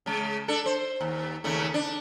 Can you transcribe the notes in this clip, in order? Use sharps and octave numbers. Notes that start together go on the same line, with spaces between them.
C#3 G#3
D4 A4
C5
D#2
D#2 C#3 A3
D4